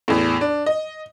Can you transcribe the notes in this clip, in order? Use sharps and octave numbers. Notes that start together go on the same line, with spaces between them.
E2 A2
D4
D#5